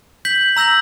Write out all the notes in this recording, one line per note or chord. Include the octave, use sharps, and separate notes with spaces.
G6 B6 F#7
A#5 E6 G6 A#6 F#7